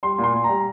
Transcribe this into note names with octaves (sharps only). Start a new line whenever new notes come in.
G3 C6
A#2
C6
A#2
G3 A#5